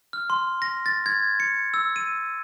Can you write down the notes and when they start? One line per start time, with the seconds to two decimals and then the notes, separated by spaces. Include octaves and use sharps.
0.13 F6
0.30 C6
0.62 A#6
0.86 A6
1.06 G#6
1.40 C#7
1.74 E6
1.96 D#7